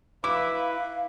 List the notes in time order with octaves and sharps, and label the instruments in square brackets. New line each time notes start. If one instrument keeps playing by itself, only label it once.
[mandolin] E4 [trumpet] B4 [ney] F5 [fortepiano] D6